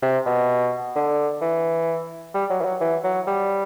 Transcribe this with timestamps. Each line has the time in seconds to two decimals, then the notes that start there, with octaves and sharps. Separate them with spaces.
0.03 C3
0.26 B2
0.96 D3
1.41 E3
2.34 G3
2.50 F#3
2.61 E3
2.65 F#3
2.81 E3
3.04 F#3
3.27 G3